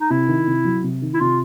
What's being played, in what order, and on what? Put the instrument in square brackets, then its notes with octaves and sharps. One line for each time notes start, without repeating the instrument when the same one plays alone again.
[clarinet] D#4
[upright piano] C3 [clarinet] E4
[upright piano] D#3
C3
F#3
C3
D#3
[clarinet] E4
[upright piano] C3 [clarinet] F4